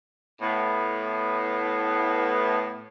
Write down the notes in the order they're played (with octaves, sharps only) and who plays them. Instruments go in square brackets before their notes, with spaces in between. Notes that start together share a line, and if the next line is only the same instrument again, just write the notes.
[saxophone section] A2 B3